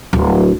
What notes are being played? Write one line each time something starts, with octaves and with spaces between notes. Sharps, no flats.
D1